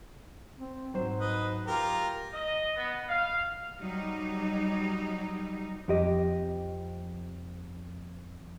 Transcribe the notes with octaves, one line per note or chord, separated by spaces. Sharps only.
C4
G#2 F#3 C5
B4 D#5
F4 G4 A#4
D#5
B3
F5
F#3 G3 D#4
F2 G4 D#5